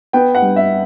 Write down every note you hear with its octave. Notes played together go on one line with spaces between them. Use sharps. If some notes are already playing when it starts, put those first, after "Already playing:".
B3 G5
F#5
G2
E5